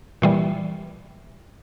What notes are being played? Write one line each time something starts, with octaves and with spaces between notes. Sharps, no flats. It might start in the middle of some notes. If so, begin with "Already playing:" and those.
A#2 E3 G3